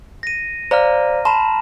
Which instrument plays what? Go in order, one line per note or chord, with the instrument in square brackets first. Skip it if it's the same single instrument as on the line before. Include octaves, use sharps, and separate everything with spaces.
[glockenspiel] A#6 D#7
[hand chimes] C5 D5 F5 [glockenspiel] A#5 F6
[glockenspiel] A5 E7 [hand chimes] B5 C6